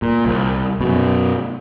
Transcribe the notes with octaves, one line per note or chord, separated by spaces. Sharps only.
A#2
C2
F#2 B2